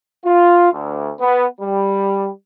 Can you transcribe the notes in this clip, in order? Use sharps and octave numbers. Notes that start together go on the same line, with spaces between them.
F4
D2
B3
G3